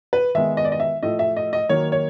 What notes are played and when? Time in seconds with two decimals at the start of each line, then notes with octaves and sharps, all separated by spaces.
0.13 B4
0.35 D#3 G#3 B3 E5
0.57 D#5
0.65 D5
0.72 D#5
0.80 E5
1.03 A2 F3 A3 D#5
1.19 E5
1.37 D#5
1.53 D#5
1.69 D#3 F#3 A#3 C#5
1.92 C#5